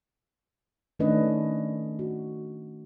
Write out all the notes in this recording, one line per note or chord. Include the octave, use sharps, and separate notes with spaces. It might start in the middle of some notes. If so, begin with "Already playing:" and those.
D#3 A3 C#4 D4 B4 D#5
F#4